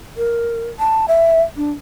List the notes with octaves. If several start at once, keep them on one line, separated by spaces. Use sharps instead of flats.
A#4
A5
E5
D4